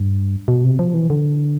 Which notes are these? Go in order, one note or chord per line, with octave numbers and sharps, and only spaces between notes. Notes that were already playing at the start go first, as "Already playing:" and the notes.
Already playing: G2
B2
C3
F3
E3
D3